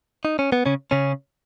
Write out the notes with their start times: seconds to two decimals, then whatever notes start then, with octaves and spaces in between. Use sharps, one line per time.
0.25 D#4
0.39 C#4
0.52 B3
0.66 C#3 C#4
0.91 C#3 C#4